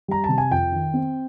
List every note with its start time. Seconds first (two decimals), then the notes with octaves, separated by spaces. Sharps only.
0.08 G3 A#5
0.24 C3 A5
0.38 G#5
0.51 F2 G5
0.72 D#3
0.94 C4